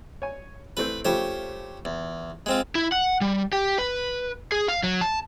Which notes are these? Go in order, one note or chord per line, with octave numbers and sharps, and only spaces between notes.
C#5 G#5
E3 A3 C4 B4
C#3 F3 A3 G4 C5 C#5
E2
G#3 C4 F4
E4
F#5
G3
G4
B4
G#4
F5
F#3
A5